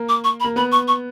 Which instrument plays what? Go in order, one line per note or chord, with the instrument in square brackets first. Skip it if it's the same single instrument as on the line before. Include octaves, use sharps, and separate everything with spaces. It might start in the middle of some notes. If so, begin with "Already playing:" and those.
Already playing: [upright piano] A#3
[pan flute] D6
C#6
B5
[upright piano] A#3
[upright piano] B3 [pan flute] B5
[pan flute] C#6
C#6